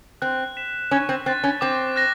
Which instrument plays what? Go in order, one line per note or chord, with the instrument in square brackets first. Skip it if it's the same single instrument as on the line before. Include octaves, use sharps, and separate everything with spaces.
[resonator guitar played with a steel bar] C4 [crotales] F#6
[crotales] B6 E7
[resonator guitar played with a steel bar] C#4 [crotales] C#6
[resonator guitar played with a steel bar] C4
[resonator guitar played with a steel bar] C4 [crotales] F#6 A6
[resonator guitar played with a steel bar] C#4
[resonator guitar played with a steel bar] C4 [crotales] D6
[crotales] F#6 A#6